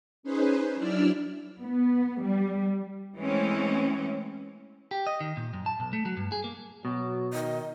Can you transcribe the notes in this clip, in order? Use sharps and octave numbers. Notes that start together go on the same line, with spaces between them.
C#4 D#4 G#4 B4 C5
F#3 D4 E4 D5 E6 F6
B3
G3
E3 G#3 A3 C4 C#4
G4
D#5
D#3
A#2
F#2
A5
B1
A3
F#3
G2
G#4
A#3
B2 F#3
D#3 D#5